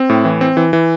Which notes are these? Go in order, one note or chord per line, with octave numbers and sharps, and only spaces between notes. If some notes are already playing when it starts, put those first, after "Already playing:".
Already playing: C4
A2
E3
C4
E3
E3